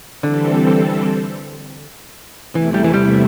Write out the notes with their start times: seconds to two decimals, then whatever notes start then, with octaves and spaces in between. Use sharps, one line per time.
0.22 D3 E3 G3 C4 A4
2.54 E2 C3 E3 A3 E4
2.74 G3
2.84 E3
2.94 G3